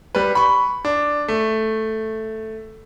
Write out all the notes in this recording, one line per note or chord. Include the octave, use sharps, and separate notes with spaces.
G3 B4
B5 C#6
D4
A3